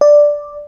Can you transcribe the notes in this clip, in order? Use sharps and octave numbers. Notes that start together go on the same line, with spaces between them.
D5